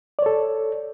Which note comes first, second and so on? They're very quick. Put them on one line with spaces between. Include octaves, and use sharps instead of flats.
D5 C#5 A4